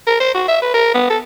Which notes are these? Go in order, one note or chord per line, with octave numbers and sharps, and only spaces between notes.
A#4
C5
F#4
E5
B4
A#4
B3
A4